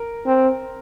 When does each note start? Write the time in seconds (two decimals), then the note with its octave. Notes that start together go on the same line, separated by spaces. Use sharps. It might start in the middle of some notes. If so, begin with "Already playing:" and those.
Already playing: A#4
0.26 C4